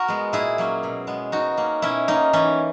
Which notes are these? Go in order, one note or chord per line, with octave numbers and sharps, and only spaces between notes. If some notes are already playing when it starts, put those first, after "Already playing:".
Already playing: F#4 A#4
G#3 B3
A#2 E4 G#4
F#3 A#3 C#4
B2
G#3 B3
B2 D#4 F#4
A#3 C#4
B2 C#4 E4
A#3 C#4 D#4
E3 C#4